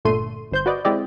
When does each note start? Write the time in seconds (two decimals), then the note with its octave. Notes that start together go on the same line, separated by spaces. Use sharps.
0.05 G1 A#2 D3 A3 C6 D#7
0.51 G1 C5 G6
0.66 F#4 B4 D5 D#5
0.85 G#3 C4 E4 G4 D5 D#5